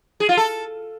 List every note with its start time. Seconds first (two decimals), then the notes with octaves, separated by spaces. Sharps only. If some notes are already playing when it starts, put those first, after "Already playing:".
0.20 G#4
0.29 F4
0.37 A4